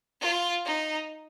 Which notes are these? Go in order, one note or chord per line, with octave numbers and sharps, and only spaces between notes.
F4
D#4